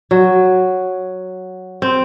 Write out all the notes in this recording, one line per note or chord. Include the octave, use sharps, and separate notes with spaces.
F#3
C4